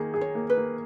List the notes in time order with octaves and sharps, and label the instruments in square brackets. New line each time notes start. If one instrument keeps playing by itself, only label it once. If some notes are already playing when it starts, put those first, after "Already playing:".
Already playing: [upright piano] D#3 A#3 G#4
G#4
[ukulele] C#5
[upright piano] A#3
[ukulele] B4
[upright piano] A#3